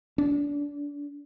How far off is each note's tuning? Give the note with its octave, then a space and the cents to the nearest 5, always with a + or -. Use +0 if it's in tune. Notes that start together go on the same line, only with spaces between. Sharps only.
D4 -25